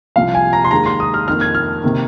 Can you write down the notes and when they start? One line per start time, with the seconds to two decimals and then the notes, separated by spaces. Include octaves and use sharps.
0.16 C2 C3 F3 F5
0.35 G#5
0.53 A#5
0.65 C6
0.71 D#2 D#3 G#3 A#5
0.86 C6
1.00 D#6
1.14 F6
1.28 F2 D#3 A#3 F6
1.41 G#6
1.55 F6
1.83 C3 D#3 A#3